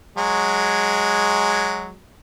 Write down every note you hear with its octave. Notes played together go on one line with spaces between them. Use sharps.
F#3 G#3